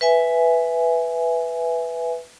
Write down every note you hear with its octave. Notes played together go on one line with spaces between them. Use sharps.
B4 E5 G#5